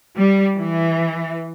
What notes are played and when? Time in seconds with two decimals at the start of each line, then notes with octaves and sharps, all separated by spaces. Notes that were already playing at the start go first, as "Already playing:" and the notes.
0.15 G3
0.57 E3